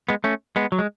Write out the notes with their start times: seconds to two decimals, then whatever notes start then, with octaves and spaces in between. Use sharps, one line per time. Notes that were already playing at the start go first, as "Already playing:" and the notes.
0.09 G#3 B3
0.24 A3 C#4
0.56 G#3 B3
0.72 F#3
0.79 G#3